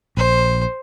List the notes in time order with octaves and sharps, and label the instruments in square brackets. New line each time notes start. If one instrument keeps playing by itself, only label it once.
[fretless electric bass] A#1 [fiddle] C5